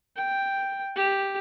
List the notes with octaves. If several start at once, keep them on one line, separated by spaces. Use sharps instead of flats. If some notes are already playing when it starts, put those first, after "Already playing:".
G5
G4